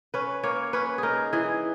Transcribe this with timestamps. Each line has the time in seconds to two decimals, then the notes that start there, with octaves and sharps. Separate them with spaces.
0.14 C#4 B4
0.43 A#3 C#5
0.73 C#4 B4
0.98 D#4 G#4 A#4
1.33 E3 G#4